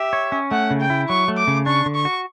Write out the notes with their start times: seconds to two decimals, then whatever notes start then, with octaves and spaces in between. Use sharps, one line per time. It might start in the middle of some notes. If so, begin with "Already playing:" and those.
Already playing: G4 E5
0.13 C#5
0.32 C#4
0.51 A3 F#5
0.71 C#3
0.81 G5
0.90 E4
1.09 F#3 C#6
1.28 A3
1.37 D6
1.47 C#3
1.66 D4 C#6
1.86 D3
1.95 C#6
2.05 F#4